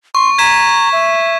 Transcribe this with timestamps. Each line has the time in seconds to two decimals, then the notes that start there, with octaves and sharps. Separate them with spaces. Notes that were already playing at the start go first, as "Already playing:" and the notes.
0.15 C6 C#6
0.38 A#5 G#6 B6 E7
0.92 E5